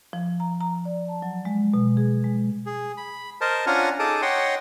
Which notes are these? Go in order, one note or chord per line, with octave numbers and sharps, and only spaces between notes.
F3
A#5
A#5
D5
A5
F#3
G#3
B2
G#4
G#3
G#4
B5
A#4 C5 D#5 A5
C#4 D4 F4 F#5 G#5 A#5
D#4 G#4 A4 A5 D6 D#6
C#5 D#5 F#5 G5 C6